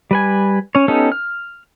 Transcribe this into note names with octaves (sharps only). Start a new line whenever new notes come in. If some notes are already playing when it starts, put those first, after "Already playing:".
G3 B4 G#5
C#4 C#5
B3 C#4 D#4 G4 A4
F6